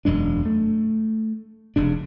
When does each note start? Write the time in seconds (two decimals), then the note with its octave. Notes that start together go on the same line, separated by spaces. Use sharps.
0.05 E1 F#2 G#3 D4
0.45 A3
1.76 F1 C#3 D4